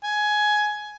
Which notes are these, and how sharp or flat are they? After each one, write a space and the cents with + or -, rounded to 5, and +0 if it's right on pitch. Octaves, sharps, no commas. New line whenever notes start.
G#5 +15